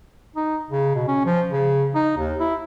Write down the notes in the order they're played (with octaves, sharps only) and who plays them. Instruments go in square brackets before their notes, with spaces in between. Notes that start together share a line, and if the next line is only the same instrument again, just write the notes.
[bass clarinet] D#4
C#3
B2
C#4
F3
C#3
D#4
D#2
E4